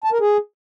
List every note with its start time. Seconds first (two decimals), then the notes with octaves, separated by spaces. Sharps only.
0.04 A5
0.12 A#4
0.20 G#4